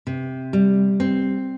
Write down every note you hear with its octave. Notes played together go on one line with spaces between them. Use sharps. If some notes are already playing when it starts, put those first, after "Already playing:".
C3
G3
C4